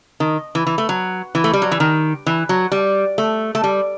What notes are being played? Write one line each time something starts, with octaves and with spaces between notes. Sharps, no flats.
D#3
E3
E3
A3
F#3
E3
A3
G3
F#3
E3
D#3
E3
F#3
G3
A3
A3
G3